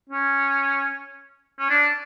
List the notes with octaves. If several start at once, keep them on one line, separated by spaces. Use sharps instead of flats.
C#4
C#4
D4